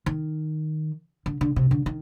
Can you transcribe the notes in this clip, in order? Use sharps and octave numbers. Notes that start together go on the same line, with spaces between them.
D#3
D3
D3
C3
D3
D#3